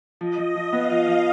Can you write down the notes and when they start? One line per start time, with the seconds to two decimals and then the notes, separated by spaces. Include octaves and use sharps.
0.20 F3 D#5
0.38 F3
0.55 F3
0.73 B3 F5
0.90 F3
1.07 F3